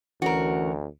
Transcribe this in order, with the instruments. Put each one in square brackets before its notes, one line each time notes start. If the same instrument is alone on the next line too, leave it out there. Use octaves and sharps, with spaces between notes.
[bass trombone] D2 [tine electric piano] E3 C#4 [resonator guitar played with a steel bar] F#4 A#4